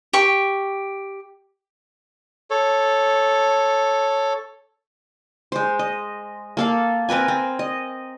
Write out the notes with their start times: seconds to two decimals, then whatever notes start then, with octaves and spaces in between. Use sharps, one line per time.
0.13 G4 C#6
2.50 A4 C#5
5.52 G#3 C5
5.79 D#5
6.57 A#3 A4 F5
7.09 C4 A#4 B4 G#5
7.28 C4
7.59 D#5